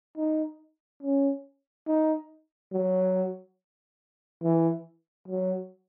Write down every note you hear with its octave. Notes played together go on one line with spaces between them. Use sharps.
D#4
C#4
D#4
F#3
E3
F#3